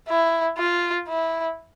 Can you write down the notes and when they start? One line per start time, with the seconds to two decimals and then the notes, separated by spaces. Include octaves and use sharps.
0.09 E4
0.58 F4
1.08 E4